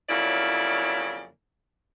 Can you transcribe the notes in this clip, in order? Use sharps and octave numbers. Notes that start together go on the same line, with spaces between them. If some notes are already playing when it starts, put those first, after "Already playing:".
F2 C#3 F#3 A#3 E4 D5